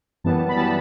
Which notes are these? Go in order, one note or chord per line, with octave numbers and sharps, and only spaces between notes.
F#2 E3 G3 B3 A5
B5
E3 G3 B3 A5